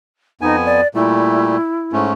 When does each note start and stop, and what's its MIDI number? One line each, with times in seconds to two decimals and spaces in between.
0.41 0.81 41
0.41 0.81 59
0.41 0.56 63
0.41 0.81 80
0.66 0.87 74
0.95 1.57 46
0.95 1.57 55
0.95 1.57 57
0.95 2.04 64
1.93 2.13 44
1.93 2.13 57
1.93 2.13 61